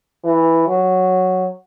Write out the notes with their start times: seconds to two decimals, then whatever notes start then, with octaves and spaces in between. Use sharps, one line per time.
0.24 E3
0.67 F#3